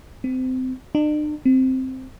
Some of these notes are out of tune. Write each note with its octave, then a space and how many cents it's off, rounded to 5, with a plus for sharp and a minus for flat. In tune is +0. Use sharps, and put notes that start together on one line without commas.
C4 -25
D4 +45
C4 -5